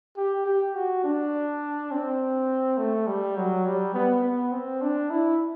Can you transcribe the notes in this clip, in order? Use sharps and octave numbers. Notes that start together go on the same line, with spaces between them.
G4
G4
F#4
D4
C4
A3
G3
F#3
G3
B3
B3
C4
D4
E4